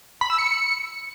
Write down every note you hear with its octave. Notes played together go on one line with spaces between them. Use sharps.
B5
E6
C#7